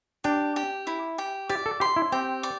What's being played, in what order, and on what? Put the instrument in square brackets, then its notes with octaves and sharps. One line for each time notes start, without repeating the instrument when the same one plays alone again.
[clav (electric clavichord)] D4 [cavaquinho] G4
[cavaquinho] G4
E4
G4
[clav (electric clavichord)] G4 [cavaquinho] D5
[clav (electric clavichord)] A4
[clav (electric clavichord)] G4 [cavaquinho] C6
[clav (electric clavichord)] E4
[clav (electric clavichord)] C4 [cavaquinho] G4
[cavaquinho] D5